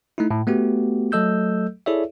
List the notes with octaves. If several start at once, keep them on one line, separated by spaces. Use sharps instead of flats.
A3 D#4 E4
A2
A3 B3 F#4 G4
F#3 A3 A4 D#5 E6 G6
E4 G#4 A4 C#5 D5 E5